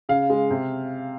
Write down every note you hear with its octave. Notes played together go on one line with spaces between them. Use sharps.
C#3 F5
G#3
C3